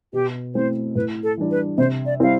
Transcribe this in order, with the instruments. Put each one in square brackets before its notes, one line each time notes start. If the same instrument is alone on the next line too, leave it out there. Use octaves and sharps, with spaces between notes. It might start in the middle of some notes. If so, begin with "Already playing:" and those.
[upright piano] B2 [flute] G4
[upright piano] A3 C4 E4 [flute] C5
[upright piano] A2 [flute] B4
[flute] A4
[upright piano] E3 G3 D4
[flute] B4
[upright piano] C3 [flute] C5
[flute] D5
[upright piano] G3 C4 E4 [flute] F5